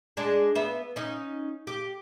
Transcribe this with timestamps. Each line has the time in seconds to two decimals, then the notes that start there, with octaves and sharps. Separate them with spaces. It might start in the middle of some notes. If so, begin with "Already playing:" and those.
0.17 G#3 D4 G#4
0.55 B3 E5
0.96 C#4 D#4
1.67 G4